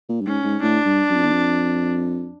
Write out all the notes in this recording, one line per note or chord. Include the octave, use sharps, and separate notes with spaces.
A#2
G2
G#2 C#4
G#2
A2 D4
G2
F#2
F2
E2
F2